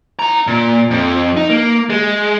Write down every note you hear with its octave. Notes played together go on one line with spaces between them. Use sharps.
E4 A#5
A#2
F2
D#4
A#3
G#3